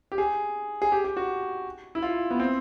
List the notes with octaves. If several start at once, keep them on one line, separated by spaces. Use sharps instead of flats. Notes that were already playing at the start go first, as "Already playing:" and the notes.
G4
G#4
G#4
G4
G4
F#4
E4
F4
B3
C4